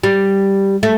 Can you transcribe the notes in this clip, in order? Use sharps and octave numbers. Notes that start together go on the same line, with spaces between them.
G3
A3